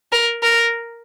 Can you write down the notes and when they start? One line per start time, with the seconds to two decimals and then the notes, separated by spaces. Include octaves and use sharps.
0.12 A#4
0.43 A#4